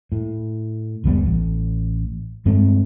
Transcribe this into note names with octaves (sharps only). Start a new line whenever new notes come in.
A2
F1 C#2 G3 B3
A1
G2 G#3 A3 C4